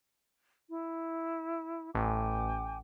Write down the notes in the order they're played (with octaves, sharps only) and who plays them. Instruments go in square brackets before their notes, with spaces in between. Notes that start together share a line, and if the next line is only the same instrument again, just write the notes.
[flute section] E4
[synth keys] A1 [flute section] G5 G#5 D6